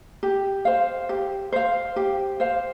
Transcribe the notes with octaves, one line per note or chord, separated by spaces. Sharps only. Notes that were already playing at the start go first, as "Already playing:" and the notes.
G4
C5 F5
G4
C5 F5
G4
C5 F5